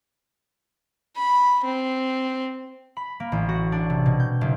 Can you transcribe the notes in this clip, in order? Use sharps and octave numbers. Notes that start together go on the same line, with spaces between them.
B5
C4
B5
A#3
A1
F#4
D4
C3
B2
G6
F#1